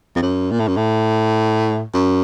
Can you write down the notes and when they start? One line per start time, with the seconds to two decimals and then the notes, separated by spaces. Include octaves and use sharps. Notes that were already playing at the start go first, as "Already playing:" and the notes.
0.16 F2
0.23 F#2
0.51 A#2
0.59 A2
0.68 F#2
0.77 A2
1.94 F#2